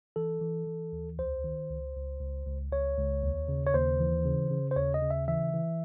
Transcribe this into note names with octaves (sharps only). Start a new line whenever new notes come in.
E3 A4
E3
E3
D#2
C#2 C5
D#3
C#2
C#2
C#2
C#2
C#2 C#5
C#2
D#2
C#3
C#5
D#2 C5
E3
C#3
C#3
C5
D#2 C#5
D#5
C#3
E5
E3 E5
E3